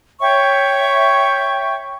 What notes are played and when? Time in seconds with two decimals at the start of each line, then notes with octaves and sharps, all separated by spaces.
0.20 C#5 E5 G5 C#6